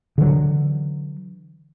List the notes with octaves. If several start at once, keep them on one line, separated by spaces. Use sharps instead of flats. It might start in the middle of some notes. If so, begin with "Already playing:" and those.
D3 E3 F#3